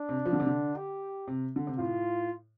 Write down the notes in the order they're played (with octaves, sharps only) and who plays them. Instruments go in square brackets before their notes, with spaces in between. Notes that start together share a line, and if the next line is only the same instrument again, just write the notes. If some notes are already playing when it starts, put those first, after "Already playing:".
Already playing: [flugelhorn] D4
[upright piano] C3
F3
D3
C3
D3
[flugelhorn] G4
[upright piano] C3
D3
C3
[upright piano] A2 [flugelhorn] F4